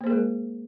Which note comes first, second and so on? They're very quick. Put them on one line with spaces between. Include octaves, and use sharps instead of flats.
A#3 C5 G#4 A#4 G#3